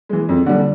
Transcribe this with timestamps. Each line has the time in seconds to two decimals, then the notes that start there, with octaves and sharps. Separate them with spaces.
0.09 E3 G#3
0.29 F2
0.46 D3 G3